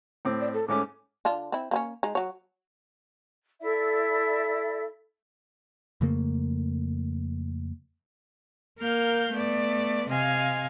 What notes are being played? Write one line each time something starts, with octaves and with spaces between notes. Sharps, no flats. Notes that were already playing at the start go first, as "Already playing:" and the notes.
A2 C4 D6
D5
A4
G#2 A3 C#4 D6
D3 D4 F4
C4 E4
A#3 C4 C#4
G#3 D#4
F#3 C#5
E4 A4 D5 E5
F2 C#3 A3 A#3
A#3 A#4 F5 G6
A3 B3 D5
C3 D#5 F5 G#5 G#6